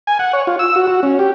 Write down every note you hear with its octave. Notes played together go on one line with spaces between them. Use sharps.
G#5
F#5
C#5
F4
E6
F#4
F#4
C#4
G4